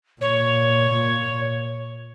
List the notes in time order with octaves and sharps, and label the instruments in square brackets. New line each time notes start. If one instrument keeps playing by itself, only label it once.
[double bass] A#2 [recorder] C#5